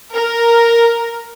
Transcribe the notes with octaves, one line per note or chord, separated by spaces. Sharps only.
A#4